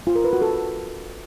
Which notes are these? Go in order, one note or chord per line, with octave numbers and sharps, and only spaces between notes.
F4
A#4
B4
F#4
A4